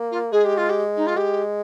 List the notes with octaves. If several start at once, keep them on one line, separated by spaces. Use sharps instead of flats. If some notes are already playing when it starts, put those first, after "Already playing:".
Already playing: A#3
F4
G#3 G#4
G4
F4
G4
D#4
F4
G#3 G4